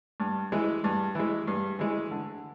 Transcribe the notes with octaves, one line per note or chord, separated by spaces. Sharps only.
G2
E3 G#3
G2
E3 G#3
G2
E3 G#3
D3